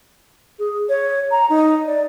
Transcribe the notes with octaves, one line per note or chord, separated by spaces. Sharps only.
G#4
C#5
A#5
D#4
D5